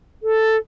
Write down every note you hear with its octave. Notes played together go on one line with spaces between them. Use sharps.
A4